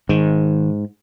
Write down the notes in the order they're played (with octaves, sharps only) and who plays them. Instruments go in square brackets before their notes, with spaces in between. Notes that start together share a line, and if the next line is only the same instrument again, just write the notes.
[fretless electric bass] G#2 [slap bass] D#3